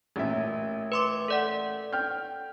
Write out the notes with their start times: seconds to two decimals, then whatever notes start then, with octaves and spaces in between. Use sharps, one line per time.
0.16 A1 A#2 E5
0.92 B4 C6 D6
1.28 A4 D5 F#5
1.92 G5 F6 G6